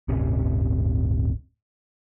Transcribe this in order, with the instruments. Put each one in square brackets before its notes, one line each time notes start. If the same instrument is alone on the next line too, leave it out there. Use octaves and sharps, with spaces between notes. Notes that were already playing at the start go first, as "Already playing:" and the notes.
[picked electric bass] D1 G1 C3 C#4